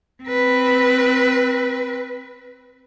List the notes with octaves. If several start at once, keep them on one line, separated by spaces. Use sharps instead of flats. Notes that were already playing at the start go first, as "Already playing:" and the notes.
C4 B4